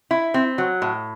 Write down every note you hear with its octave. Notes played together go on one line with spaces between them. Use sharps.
E4
C4
F#3
A2